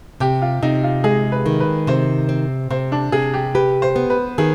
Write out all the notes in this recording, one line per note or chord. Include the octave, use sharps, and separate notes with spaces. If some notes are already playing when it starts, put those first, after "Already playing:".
C3 G4
F4
C3 D#4
F4
G#3 G#4
B4
D#3
B4
C3 C5
C4
C3 C5
D4
C3 G#4
G4
G4 B4
C5
B3
B4
D#3 G#4